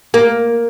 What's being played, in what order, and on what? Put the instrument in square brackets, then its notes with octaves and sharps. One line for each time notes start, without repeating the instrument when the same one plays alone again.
[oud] A#3